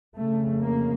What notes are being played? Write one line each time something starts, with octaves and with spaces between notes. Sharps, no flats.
F2 C#3 A3
A#3